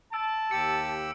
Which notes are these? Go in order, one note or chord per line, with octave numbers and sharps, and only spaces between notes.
A5 E6 D7
D#2 G4 E6 C#7 D7